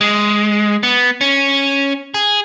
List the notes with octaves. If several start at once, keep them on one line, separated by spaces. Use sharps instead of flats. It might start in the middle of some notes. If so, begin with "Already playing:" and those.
G#3
B3
C#4
G#4